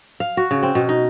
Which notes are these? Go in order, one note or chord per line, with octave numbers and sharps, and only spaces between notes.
F5
F#4
C#3
C4
B2
D#4